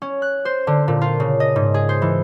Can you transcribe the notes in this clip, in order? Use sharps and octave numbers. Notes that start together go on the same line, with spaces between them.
C#4
F#6
C5
D3
A#2
F4
C#3
D#5
G#2
G#4
C5
E3